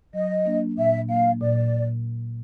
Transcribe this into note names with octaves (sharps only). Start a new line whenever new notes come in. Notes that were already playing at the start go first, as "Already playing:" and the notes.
F#3 D#5
A#3 D4
A#2 E5
F#3 A#3 F5
A#2 D5